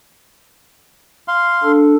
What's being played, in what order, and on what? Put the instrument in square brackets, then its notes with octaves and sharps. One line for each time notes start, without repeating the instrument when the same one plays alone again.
[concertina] F5 C6
[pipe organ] D4 A4